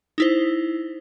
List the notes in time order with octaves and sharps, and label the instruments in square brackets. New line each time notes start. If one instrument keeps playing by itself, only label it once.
[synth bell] D#4 E4 C5